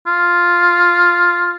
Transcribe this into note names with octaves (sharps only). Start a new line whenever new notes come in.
F4